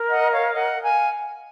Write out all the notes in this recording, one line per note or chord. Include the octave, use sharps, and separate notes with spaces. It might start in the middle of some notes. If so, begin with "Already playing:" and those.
Already playing: A#4
D#5 F#5
C#5 F5
D#5 F#5
F5 G#5